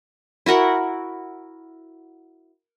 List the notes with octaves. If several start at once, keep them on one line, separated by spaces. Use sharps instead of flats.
E4 F#4 A#4 F#5